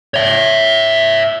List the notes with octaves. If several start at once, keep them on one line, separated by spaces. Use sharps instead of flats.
C#5 E5